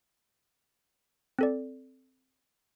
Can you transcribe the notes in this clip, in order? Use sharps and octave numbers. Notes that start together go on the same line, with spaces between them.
C4 A4 D5